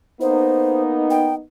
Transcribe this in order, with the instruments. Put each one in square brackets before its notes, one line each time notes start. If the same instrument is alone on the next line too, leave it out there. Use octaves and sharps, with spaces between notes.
[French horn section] A#3 B3 D#4 [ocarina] C5
[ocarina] G5